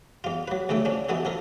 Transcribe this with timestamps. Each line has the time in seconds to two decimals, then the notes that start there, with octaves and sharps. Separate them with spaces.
0.24 E2 F4
0.48 F#3 B4
0.69 D2 C#3 A3 A4 G5
0.85 F3 C#4 D4
1.09 E3 B3 D#4 F#4 A4
1.25 F3 A4 A#4